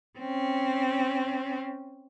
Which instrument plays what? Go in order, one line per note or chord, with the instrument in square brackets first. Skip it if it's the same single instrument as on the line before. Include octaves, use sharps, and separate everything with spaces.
[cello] C4 C#4